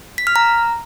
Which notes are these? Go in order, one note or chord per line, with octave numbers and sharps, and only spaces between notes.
B6
F6
A#5